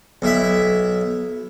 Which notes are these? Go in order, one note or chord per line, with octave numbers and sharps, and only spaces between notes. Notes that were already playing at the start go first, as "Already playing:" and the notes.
B1 E4 E5